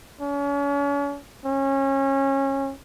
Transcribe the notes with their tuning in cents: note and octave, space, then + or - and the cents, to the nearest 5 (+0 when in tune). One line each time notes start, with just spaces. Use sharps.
C#4 +40
C#4 -25